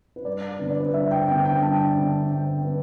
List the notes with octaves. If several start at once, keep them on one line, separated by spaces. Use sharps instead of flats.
B4
G2 D5
D3 B3 D4 B4
D5
B4
G2 E5
G5
D3 B3 D4 G5
G5
G2 A5
G5
D3 B3 D4 A5
G2 G5
B3 D4 B4